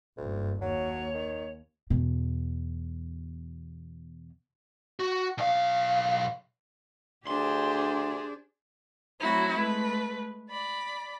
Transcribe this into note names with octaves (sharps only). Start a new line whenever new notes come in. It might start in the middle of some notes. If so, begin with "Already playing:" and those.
F#1 D2 G2
D#2 F#3 C#5
D#3
E2 B2
F#4
B1 F5
D2 D4 G4 G#4 C5 C6
F#3 A3 C4 E4 F#4
G#3 A3 B4
D5 B5